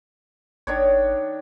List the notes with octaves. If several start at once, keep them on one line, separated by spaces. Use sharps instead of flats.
G#1 D#3 D4 C#5